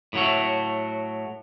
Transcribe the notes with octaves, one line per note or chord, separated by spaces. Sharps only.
A2 F#3 A3